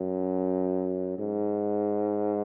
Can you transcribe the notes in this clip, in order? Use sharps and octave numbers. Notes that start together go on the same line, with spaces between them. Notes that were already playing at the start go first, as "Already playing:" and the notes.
Already playing: F#2
G#2